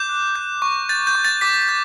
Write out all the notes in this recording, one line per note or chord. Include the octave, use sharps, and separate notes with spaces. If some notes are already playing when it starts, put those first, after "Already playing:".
Already playing: D6 G6
F#6
G6
C#6
G6 A6
G6
C#6
A6
D6 B6
G6